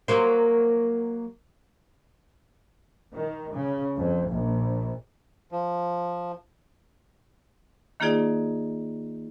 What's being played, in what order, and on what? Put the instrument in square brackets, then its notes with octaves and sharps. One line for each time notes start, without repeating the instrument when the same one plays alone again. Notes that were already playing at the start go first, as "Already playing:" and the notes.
[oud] F#3 A#3 C5
[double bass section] D#3
C#3
F2
A#1
[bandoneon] F3
[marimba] D#3 A#3 D#4 F4 G#4 D5